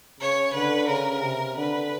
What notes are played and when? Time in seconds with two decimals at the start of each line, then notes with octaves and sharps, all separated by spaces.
0.20 C#3 C#5
0.54 D3 B4
0.88 C#3 A#4
1.23 C3
1.57 D3 B4